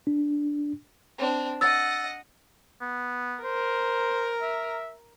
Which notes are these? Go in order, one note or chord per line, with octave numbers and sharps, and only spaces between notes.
D4
C4 D4
D#5 F#5 E6 A6
B3
A#4 C5
E5